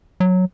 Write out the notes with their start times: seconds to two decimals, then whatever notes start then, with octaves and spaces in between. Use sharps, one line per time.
0.20 F#3